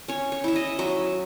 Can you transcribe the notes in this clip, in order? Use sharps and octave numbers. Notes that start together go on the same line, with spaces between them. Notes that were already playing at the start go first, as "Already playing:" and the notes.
C#4 C#5
C#5
E4 E5
D#5
F#3 E5